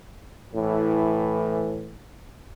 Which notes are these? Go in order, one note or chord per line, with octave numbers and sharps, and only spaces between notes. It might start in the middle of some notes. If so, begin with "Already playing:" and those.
A2 E3